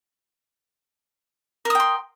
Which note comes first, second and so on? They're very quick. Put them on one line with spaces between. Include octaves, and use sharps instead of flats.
A#4 D#6 G5 C6